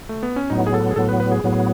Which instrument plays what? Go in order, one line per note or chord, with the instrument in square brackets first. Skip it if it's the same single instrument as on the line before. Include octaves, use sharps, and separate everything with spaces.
[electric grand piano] A3
B3
C#4
[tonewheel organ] A2 F#3 B3 [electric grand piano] D#4
[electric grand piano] G#4
A4
G#4
[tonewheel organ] A2 F#3 B3 [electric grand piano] A4
[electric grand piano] B4
B4
G#4
[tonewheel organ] A2 F#3 B3